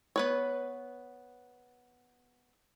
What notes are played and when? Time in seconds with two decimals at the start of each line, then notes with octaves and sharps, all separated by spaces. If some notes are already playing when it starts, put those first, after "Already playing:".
0.16 B3 B4 C#5